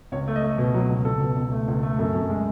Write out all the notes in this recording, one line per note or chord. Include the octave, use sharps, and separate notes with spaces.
C#2 C#5
A3
D#5
A3
B2
F#3
C#2
C#2 A4
B2
C#2
A3
C#2
A3
F#2 A4
F#2
G#3